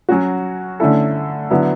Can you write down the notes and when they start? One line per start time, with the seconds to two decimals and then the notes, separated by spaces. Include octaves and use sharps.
0.09 F#3 C#4 F#4
0.80 D3 A3 C#4 E4 A4
1.50 D3 F#3 B3 E4